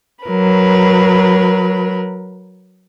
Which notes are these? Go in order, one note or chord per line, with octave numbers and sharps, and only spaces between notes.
F#3 A#4 B4